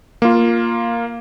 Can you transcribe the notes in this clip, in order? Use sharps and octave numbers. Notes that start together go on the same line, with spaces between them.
A#3 F4